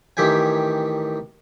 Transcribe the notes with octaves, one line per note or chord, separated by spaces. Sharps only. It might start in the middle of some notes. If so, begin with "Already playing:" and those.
A1 D#3 G4 E5 G5 G#5